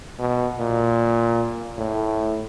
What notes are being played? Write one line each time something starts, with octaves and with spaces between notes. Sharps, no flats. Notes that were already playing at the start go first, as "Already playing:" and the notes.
B2
A#2
A2